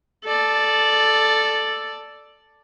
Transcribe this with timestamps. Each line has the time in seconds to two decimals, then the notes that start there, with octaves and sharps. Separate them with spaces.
0.24 A4 D5